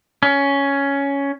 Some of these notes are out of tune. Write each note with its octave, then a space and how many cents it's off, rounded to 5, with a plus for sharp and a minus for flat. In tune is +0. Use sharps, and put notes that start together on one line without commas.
C#4 +10